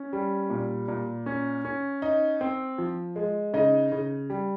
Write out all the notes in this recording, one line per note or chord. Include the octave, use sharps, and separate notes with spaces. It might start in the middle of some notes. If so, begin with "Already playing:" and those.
Already playing: C#4
G3
A#2
A#2
C#4
C#4
D#4
C4
F3
G#3
C#3 D#4 D#5
C#3
G3